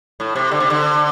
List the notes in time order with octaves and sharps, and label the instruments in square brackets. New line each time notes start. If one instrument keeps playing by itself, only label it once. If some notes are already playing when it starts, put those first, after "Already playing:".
[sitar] A2
C3
D3
C3
D3